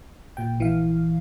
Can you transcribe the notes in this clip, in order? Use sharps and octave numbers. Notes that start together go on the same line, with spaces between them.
A#2 G5
A#1 E3 F5